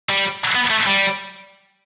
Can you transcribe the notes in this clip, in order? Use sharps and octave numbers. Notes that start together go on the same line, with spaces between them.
G3
B3
A3
G3